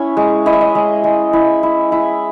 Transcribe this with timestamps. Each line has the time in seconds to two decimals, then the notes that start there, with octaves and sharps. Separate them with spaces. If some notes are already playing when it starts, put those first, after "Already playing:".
Already playing: C#4 E4 E5
0.17 G#3
0.46 E4 D#5
0.53 E5
0.61 D#5
0.75 G#3
1.04 G#3
1.33 E4
1.63 E4
1.92 E4